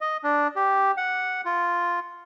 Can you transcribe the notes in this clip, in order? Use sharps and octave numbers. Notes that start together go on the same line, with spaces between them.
D#5
D4
G4
F#5
F4